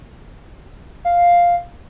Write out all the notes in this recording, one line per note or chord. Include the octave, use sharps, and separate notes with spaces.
F5